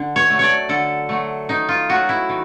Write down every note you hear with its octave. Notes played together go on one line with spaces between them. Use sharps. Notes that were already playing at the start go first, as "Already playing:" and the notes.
Already playing: D3
C#5
F#3 A3
C#5 D5
D3 A4
F#3 A3
D#3 D#4
F4
F#3 A3 F#4
E4
D#3